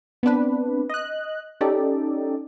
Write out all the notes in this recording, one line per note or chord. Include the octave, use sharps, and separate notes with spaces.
B3 C4 D4 B4
D#5 F#6
C#4 D#4 G4 A4 D5